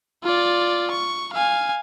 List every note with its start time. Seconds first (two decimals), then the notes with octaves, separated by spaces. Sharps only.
0.24 F4 D5
0.91 C#6
1.33 F5 G#5